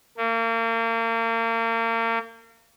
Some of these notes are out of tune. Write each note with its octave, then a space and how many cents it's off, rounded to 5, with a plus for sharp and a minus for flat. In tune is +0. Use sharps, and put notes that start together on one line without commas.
A#3 -35